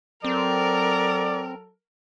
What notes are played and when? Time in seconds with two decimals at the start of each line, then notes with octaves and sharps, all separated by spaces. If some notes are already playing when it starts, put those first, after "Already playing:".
0.25 F#3 C4 A4 A#4 D5